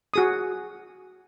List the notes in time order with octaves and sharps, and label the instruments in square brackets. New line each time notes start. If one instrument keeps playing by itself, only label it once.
[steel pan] F#4 G#4 D#6